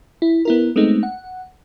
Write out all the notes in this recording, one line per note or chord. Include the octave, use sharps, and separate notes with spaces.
E4
B3 E4 A#4
G#3 A3 B3 C4 D#4
F#5